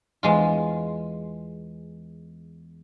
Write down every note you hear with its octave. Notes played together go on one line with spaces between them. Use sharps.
E2 G#3 F4